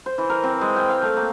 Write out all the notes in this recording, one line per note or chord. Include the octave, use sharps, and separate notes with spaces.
C5
E3
A#4
C4
G#3
G5
F5
A3
A#3